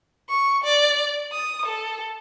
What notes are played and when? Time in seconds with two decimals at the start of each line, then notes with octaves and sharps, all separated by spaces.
0.29 C#6
0.64 D5
1.32 D#6
1.66 A4